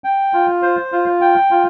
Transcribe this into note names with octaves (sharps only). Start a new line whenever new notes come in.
G5
F4
C5
F4
G5
F4